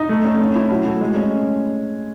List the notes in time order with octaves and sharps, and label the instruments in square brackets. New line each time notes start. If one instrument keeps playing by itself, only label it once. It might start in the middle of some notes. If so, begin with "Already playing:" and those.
Already playing: [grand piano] D#4
A3
C#4
C#4
E4
F#3
A3
G#3
C#4